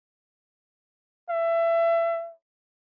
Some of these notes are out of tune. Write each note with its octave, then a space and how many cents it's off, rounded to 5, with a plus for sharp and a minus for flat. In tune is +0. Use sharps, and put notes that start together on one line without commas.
E5 +25